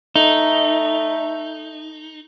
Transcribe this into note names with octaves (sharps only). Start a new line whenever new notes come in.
A3 D#4